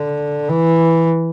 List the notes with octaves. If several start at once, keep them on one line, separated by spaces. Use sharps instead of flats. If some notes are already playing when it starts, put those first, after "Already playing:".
Already playing: D3
E3